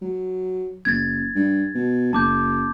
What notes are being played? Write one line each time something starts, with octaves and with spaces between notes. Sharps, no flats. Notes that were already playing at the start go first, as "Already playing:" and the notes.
F#3
F#1 G#6 A6
G2
B2
F#1 A5 D6 G6